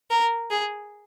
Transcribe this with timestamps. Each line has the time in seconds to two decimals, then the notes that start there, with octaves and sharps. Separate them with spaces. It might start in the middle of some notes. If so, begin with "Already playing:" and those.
0.10 A#4
0.50 G#4